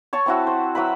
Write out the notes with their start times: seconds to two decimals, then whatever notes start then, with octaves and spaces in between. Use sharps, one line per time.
0.13 C#5 A5 C#6
0.26 C4 E4 F#4
0.47 C5
0.75 F#3 E4 B4 B5